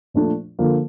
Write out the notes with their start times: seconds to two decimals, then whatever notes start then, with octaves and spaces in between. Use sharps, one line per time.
0.14 A#2 F3 A3 D4
0.59 D3 F3 A#3